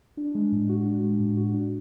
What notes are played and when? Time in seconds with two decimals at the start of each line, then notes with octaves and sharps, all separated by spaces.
0.17 D4
0.35 G#3
0.52 A2
0.69 F#4
0.86 D4
1.03 G#3
1.20 A2
1.37 F#4
1.54 D4